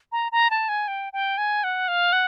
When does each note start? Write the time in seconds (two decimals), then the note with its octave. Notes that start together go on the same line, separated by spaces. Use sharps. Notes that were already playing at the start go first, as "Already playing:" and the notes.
0.12 A#5
0.32 A#5
0.50 A5
0.69 G#5
0.88 G5
1.13 G5
1.38 G#5
1.64 F#5
1.88 F5
2.13 F#5